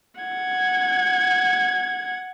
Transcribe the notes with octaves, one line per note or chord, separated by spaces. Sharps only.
F#5 G#6